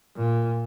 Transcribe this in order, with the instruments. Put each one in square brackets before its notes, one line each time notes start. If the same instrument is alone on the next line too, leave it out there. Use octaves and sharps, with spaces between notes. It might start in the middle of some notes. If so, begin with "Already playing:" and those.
[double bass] A#2